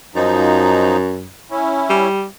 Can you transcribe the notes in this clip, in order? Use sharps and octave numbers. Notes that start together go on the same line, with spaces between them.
F#2 F3 D#4
C#4 E4
G3